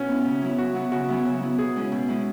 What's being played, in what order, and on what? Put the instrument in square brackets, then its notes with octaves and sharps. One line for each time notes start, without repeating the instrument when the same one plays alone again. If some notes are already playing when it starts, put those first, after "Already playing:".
Already playing: [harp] B2 [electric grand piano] C#4
[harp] B3 E4
C#3
F#3 B3 E4
[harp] C#3 [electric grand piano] F#4
[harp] F#3 B3 E4
[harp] C#3 [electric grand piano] F#4
[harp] F#3 B3 E4
C#3
F#3 B3 E4
[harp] B2 [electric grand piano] G#4
[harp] G#3 C#4 E4
B2
G#3 C#4 E4